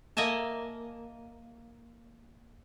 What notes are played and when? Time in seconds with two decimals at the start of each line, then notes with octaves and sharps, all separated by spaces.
0.17 A#3 D#5 E5 G#5 A5